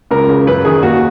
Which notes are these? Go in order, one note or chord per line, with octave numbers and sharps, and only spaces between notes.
C#2 A#4
C#3
F#2 B4
D#3 G#4
D#2 F#4